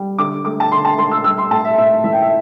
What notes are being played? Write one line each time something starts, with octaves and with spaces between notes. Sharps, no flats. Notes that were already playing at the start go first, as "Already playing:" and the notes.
Already playing: G3
D3 D6
A3 D6
A5
D3 C6
A5
A3 C6
E6
G3 E6
C6
A2 A5
E5
A2 E5
E3 E5
G5
E5